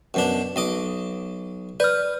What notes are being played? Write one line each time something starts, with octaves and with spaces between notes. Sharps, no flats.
F#2 B2 D4
B1 D#5 D6
B4 D5 F6